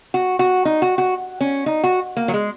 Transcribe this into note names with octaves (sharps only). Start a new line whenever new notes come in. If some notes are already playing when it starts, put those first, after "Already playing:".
F#4
F#4
D#4
F#4
F#4
C#4
D#4
F#4
A#3
F#3
G#3